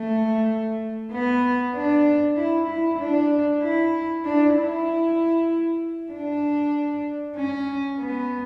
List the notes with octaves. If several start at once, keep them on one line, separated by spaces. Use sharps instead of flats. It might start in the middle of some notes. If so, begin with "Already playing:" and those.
Already playing: A3
B3
D4
E4
E4
D4
E4
D4
E4
D4
C#4
B3